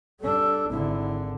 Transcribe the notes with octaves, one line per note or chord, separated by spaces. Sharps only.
G3 D4 A4
G#1 D3 E4